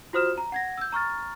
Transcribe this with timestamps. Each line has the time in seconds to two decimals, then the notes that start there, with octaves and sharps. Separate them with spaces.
0.13 F4 F#4 C5 D#6 F6 E7
0.38 A#5
0.52 F#5 G#6 A#6
0.78 E6 G6
0.92 A#5 C#6 F6 A6